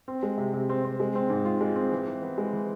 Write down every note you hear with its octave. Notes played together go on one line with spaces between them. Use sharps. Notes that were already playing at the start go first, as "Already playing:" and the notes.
C4
G#3
C3
C3
C4
C4
G#3
C4
G#2
F4
G#3
C4
E3
E3
B3
G#3
E3